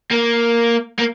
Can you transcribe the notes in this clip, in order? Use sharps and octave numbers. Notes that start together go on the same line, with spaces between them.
A#3
A#3